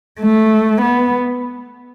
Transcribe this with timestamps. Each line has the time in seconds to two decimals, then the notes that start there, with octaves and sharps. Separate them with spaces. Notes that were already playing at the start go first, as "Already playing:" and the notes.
0.21 A3
0.81 B3